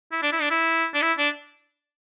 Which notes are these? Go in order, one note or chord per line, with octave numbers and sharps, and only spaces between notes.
E4
D4
E4
D4
E4
D4
E4
D4